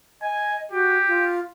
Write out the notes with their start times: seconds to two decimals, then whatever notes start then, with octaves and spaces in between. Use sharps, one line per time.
0.22 D#5 G#5
0.72 F#4 G4
1.08 F4